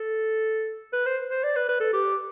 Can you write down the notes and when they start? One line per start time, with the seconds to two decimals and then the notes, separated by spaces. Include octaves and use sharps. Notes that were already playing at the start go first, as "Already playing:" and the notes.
Already playing: A4
0.93 B4
1.06 C5
1.31 C5
1.44 D5
1.56 B4
1.69 B4
1.80 A4
1.93 G4